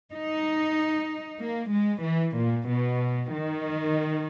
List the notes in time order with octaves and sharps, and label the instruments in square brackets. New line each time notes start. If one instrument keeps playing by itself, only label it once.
[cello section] D#4
A#3
G#3
E3
A#2
B2
D#3